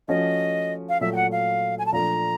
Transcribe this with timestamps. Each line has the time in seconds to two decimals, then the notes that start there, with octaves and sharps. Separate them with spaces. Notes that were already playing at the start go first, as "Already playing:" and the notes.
0.08 F3 A3 C#4 F#4 D#5
0.89 F5
1.01 A#2 F#3 A3 E5
1.13 G5
1.16 F#5
1.32 F5
1.78 G#5
1.86 A5
1.93 A#2 F3 A3 D4 A#5